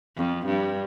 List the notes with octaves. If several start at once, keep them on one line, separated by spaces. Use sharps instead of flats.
F2
G2